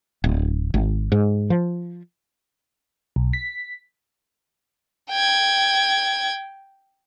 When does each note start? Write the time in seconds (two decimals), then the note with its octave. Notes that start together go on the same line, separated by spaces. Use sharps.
0.24 D1
0.74 G#1
1.12 G#2
1.50 F3
3.16 B1
3.33 B6
5.10 G5 G#6